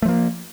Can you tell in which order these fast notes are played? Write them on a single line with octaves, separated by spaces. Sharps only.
A3 F3 A#3